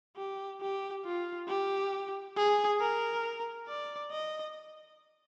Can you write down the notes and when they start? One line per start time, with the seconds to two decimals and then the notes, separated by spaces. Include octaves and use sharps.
0.17 G4
0.61 G4
1.05 F4
1.48 G4
2.36 G#4
2.80 A#4
3.68 D5
4.11 D#5